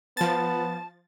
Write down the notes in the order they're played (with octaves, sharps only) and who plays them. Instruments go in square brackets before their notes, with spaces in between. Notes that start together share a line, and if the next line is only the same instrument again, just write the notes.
[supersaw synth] F3 A6 [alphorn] B3 [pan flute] A5